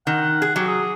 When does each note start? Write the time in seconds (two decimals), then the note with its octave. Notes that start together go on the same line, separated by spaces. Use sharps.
0.07 D#3 F#5
0.42 G#4
0.56 F#3 G4
0.67 G#4